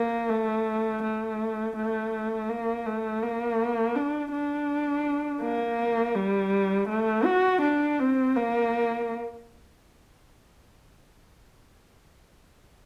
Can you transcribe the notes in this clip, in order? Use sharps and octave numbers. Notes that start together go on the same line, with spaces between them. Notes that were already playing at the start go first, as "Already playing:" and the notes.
Already playing: A#3
A3
A3
A3
A#3
A3
A#3
D4
D4
A#3
G3
A3
F#4
D4
C4
A#3